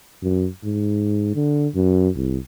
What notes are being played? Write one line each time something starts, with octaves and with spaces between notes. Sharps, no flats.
F#2
G#2
D3
F#2
C2